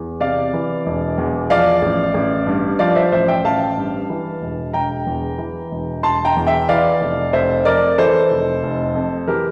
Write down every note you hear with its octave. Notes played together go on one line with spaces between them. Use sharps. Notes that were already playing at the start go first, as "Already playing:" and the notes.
Already playing: E2
C3 D5 F5
E3
E1
E2
F3 D5 F5
A1
A1
G2
F3 D5 F5
C5 E5
A1 C5 E5
E5 G5
A1 F5 A5
G2
E3
E1
E1 G5 A#5
E2
E3
E1
E1 A5 C6
G5 A#5
E2
E5 G5
E3 D5 F5
F1
F1 C5 E5
F2 A#4 D5
E3 A4 C5
F1
F1
F2
E3 G4 A#4